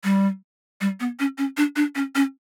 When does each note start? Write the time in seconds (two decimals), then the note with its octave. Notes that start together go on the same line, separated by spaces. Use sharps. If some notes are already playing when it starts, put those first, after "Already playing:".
0.04 G3
0.81 G3
1.00 B3
1.19 C#4
1.38 C#4
1.57 D4
1.76 D4
1.95 C#4
2.15 C#4